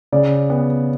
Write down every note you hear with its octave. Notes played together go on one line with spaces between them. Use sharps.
C#3 D5
B3